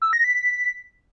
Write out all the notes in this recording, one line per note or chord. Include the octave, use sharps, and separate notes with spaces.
E6
A#6
B6